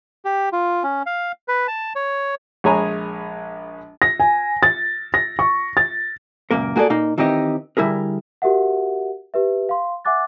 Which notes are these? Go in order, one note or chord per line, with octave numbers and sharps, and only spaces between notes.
G4
F4
C#4
F5
B4
A5
C#5
A#1 G#3 C#5 G#5 A#5 B5
A#6
G#5
A6
A#6
C#6
A6
C#2 F#2 A#2 A#3 A#4
A#3 F#4 G#4 A4 D5
A#2 A#3 D#4
D#3 E3 C4 D#4 G4 D#5
D3 G3 E4 G#4 A#4
F#4 G4 A#4 E5 F#5
G4 B4 E5
F5 C6
E5 F#5 G#5 D6 F#6 A6